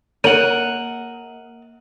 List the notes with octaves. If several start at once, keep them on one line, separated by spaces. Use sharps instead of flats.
A#3 A#4 C#5 F#5 D#7 F#7